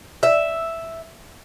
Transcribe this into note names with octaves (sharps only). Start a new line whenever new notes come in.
E5